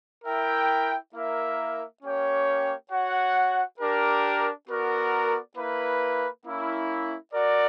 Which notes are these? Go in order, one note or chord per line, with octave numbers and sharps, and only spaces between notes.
E4 A#4 E5 G5
A#3 E4 A#4 E5
A#3 C#4 G4 C#5 G5
F#4 C#5 F#5
D4 G4 A#4
B3 F#4 A#4 D5
A#3 E4 B4
A#3 C#4 E4
F#4 A#4 D5